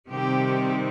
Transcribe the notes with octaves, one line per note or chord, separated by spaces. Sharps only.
C3 D#3 G3 C4 G4